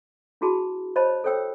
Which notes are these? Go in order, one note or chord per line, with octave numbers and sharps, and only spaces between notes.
D4 E4 F#4 G#4 A5 B5
C5 C#5 D#5 A5 B5
A4 C5 C#5 G5 E6